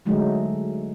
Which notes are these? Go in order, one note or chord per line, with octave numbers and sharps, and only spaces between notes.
D3 F#3 G#3 A3 D#4